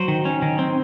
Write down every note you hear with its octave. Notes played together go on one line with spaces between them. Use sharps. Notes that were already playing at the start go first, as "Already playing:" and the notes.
Already playing: F#3 C5
D#3
C#4
D#3
C4